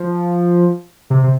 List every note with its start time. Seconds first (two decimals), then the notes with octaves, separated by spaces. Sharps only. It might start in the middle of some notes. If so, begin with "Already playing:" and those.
Already playing: F3
1.10 C3
1.24 C3